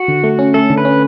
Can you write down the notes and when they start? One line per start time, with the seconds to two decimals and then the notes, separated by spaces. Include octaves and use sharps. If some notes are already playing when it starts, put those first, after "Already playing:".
Already playing: F#4
0.08 D3
0.24 A3
0.39 C#4
0.54 A3 A4
0.70 D3
0.78 B4
0.85 C#4